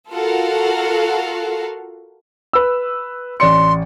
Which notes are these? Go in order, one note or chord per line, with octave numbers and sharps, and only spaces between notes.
F4 F#4 A4 A#4 F5 F#5
B4 E6
A1 D5 C6 C#7